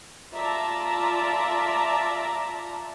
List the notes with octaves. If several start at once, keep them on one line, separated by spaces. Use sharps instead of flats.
F4 D5 E5 A5 A#5